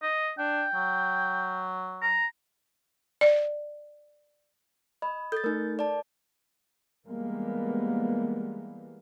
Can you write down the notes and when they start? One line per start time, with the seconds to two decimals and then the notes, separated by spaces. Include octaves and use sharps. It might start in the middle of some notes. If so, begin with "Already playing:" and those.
0.03 D#5
0.39 D4 G5
0.75 F#3
2.02 A#5
3.21 D5
5.02 D#5 B5
5.32 A4 G6 A6
5.44 A3 D#4 A#4
5.79 D5 A5
7.06 E3 G3 G#3 A#3 B3